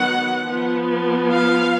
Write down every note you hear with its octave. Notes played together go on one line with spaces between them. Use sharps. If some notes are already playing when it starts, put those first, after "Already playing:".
Already playing: D#3 F#3 B3 F#5
F3 B3
F5